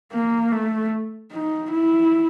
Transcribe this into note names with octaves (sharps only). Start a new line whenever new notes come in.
A#3
A3
D#4
E4